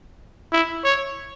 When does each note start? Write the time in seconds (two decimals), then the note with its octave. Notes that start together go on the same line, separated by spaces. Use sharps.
0.52 E4
0.84 C#5